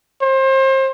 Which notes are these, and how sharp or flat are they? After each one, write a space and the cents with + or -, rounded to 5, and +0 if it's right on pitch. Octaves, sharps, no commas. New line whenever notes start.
C5 +30